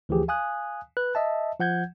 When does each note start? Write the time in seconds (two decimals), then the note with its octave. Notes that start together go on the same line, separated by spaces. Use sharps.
0.09 D2 E3 F3 G4 G#4
0.28 F5 G#5 D#6 F#6
0.97 B4 F#6
1.15 D#5 E5 A5
1.59 F3 F#5 G6 G#6